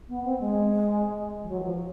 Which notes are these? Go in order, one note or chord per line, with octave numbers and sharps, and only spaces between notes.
B3
C4
G#3
F3
F#3
E3
F3